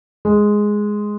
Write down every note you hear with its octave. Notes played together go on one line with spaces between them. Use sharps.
G#3